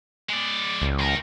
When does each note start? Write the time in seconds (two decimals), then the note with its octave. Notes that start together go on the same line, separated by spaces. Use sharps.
0.29 G#3 D5
0.82 C#2
0.99 D#3 A#4